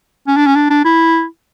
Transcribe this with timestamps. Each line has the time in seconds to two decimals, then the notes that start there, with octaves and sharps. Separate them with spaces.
0.28 C#4
0.37 D4
0.47 C#4
0.56 D4
0.70 D4
0.85 E4